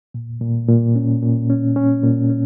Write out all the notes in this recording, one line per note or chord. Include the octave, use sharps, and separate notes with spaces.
A#2
A#2
A#2
C#4
A#2
C#4
C#4
A#2
C#4